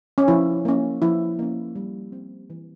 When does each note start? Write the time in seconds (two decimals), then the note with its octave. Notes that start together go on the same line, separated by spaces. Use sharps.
0.18 C#4
0.28 F3 E4
0.65 A#3 C#4
1.02 F3 E4
1.39 A#3 C#4
1.75 G3
2.12 C4
2.50 E3